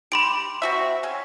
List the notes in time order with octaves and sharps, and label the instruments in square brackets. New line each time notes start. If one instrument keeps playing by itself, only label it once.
[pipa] G4 [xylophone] B5 C6 D7
[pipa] C4 F#4 E5
G#3 C#4